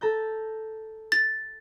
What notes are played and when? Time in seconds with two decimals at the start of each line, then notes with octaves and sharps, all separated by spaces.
0.01 A4 A#5 G6
1.12 A6